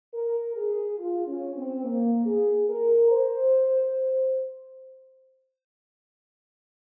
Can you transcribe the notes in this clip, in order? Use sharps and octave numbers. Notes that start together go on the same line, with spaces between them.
A#4
G#4
F4
C#4
C4
A#3
G#4
A#4
C5